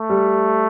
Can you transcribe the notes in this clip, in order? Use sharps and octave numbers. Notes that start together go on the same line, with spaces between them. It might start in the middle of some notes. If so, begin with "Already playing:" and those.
Already playing: A3
G3